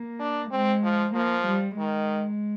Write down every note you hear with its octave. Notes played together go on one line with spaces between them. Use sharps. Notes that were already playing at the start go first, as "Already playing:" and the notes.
Already playing: A#3
D4
G#3 C4
F3
F3 A#3
G3
D#3 G#3